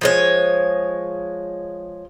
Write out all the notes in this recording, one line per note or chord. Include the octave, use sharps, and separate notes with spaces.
F3 G#3 C#5